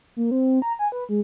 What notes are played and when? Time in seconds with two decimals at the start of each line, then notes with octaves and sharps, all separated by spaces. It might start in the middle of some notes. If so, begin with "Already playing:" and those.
0.16 A#3
0.31 C4
0.62 A#5
0.79 G#5
0.92 B4
1.09 G#3